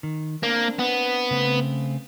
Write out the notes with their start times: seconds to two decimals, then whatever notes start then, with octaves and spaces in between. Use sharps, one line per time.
0.03 D#3
0.43 A#3 C4 D4
0.79 B3
1.31 C#3 A3 C4